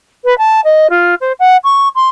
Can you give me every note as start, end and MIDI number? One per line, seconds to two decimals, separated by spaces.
0.24 0.36 71
0.38 0.60 81
0.64 0.87 75
0.90 1.14 65
1.21 1.32 72
1.39 1.57 78
1.64 1.88 85
1.95 2.09 84